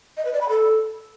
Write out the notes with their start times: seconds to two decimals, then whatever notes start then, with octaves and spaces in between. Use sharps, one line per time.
0.17 D#5
0.25 B4
0.33 D5
0.41 B5
0.49 A4